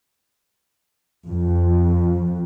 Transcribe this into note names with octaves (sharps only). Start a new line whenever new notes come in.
F2